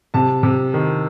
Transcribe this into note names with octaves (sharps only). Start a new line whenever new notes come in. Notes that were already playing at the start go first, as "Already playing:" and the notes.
C3 A5
C3
D#3